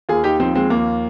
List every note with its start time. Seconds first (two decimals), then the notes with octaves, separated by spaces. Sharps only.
0.09 D#2 F4 G#4
0.24 D#4 G4
0.40 F3 C4 D#4
0.55 G#3 C4
0.70 D#2 A#3